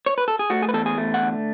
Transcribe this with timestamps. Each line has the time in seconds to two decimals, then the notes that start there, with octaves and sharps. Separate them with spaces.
0.06 C#5
0.18 B4
0.28 A4
0.39 G#4
0.50 A3 F#4
0.62 G#4
0.69 B4
0.74 E2 A4
0.86 G#4
0.98 A3
1.14 F#5
1.22 D3